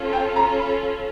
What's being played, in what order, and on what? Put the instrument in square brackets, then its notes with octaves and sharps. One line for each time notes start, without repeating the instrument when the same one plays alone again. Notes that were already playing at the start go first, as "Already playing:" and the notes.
Already playing: [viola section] C#4 F4 A4
[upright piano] G5
A#5
B5